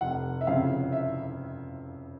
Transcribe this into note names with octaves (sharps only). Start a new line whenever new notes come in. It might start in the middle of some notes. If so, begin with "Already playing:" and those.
F1 F#5
E5
F2 C#3 F5
E5